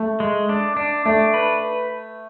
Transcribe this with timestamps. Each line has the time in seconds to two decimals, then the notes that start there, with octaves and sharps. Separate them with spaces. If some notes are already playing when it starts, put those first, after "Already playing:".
Already playing: A3
0.20 G#3
0.49 D4
0.77 D4
1.05 A3 D4
1.34 B4